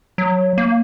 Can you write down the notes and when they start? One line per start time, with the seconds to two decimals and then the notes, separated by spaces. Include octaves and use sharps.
0.18 F#3
0.58 A#3